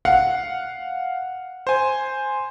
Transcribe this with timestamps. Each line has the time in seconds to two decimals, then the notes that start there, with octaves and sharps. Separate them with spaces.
0.05 F5 F#5
1.67 C5 G#5